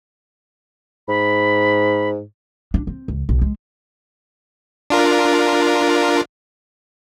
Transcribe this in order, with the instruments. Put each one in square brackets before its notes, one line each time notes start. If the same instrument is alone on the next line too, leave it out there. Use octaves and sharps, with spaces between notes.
[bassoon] G#2 [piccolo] B5
[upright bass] D4
C4
C#2
B1
G#3
[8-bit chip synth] D4 F4 A#4